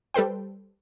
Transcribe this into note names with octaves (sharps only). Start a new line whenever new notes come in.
G3 A4 B4 C5 G5